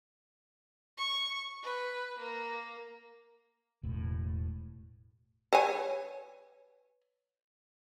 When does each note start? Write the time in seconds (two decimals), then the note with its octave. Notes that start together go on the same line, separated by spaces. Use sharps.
0.98 C#6
1.63 B4
2.18 A#3
3.83 E1 A2
5.53 B4 C#5 G#5